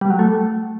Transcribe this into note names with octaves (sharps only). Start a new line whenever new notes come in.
G3
F#3
A3